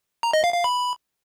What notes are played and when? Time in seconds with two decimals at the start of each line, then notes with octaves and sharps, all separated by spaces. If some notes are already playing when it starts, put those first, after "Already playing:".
0.23 A#5
0.33 D#5
0.44 F5
0.54 F5
0.64 B5